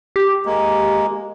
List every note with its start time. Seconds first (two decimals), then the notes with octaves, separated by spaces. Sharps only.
0.16 G4
0.45 G#3 A#3